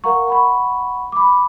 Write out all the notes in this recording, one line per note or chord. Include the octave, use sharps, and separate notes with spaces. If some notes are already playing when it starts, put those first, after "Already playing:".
A#4 F5 F#5 A#5 C#6
F#5 B5 C#6
B5 D6